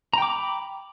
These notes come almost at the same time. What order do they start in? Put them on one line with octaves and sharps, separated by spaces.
A#5 G5 D6 B5